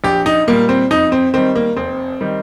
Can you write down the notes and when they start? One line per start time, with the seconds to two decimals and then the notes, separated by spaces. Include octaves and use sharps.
0.04 A#1 G4
0.26 D#4
0.47 A#2 G3 A#3
0.69 C4
0.91 F2 D#4
1.12 C4
1.34 D#3 G3 C4
1.56 A#3
1.76 F1 C4
2.21 D#3 G3